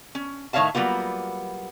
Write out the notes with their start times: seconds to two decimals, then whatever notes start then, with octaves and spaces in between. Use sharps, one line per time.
0.15 C#4
0.53 A2 D#3 C#5 E5 F5 A5
0.75 F#3 G3 A#3 B3 F4